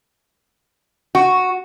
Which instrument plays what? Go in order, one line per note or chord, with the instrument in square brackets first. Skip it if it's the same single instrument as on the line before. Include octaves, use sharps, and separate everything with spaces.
[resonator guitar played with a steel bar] F#4